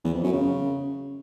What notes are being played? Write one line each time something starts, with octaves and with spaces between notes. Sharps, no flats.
E2
F2
F#2
C#3